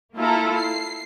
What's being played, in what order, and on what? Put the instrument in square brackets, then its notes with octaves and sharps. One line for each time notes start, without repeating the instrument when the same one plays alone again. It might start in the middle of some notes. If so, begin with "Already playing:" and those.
[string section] A#3 E4 F4 A4 A#5
C7